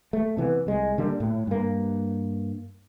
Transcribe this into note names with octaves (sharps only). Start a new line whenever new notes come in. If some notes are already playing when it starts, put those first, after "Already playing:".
A3
C3 E3 F3 B3
C2 G#3
D3 G3 A#3
A2
G2 A#3